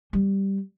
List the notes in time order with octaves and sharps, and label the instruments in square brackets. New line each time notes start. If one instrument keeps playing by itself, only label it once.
[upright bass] G3